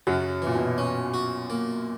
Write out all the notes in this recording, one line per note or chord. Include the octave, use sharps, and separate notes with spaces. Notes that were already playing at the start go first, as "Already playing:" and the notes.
F#2 C#3 F#3
A#2 E3
B2
C#4
F#4
A#3